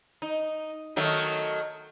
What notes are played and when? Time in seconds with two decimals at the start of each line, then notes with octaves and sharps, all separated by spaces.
0.22 D#4
0.96 D#3 F#3 A3